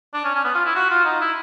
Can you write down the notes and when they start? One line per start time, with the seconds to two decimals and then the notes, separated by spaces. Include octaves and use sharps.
0.14 D4
0.24 C#4
0.35 C#4
0.44 B3
0.55 F4
0.65 E4
0.75 F#4
0.90 F4
1.05 D#4
1.20 E4